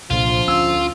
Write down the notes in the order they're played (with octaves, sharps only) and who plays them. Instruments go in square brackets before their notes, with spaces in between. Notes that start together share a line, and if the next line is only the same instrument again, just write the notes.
[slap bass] C2 A#2 [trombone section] D3 F3 [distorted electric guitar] F4
[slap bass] D2 C#4 [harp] E6